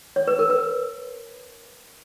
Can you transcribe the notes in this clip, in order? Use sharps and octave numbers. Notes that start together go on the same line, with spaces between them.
C#5
B4
A#4
B4